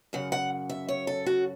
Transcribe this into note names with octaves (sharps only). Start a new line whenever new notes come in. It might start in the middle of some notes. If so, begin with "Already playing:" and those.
F#2 C#3 F#5
F#5
E5
C#5
A4
F#4